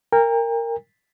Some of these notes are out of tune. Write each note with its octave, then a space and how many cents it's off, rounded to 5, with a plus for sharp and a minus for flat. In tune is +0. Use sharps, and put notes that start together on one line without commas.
A#4 -10 G5 +40